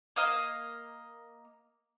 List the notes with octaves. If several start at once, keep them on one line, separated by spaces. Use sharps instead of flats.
A#3 D#5 F5